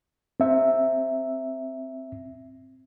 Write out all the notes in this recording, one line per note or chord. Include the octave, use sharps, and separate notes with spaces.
C4 E5